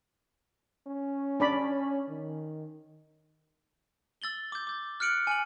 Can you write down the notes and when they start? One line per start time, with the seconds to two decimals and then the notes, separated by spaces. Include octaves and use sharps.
0.87 C#4
1.40 D4 D5 B5
2.08 D#3
4.22 E6 A6 F#7 G7
4.52 D6 G6
4.67 D6 G6
5.00 F6 F#6 C#7 D7 F#7
5.27 G#5 F6 F#7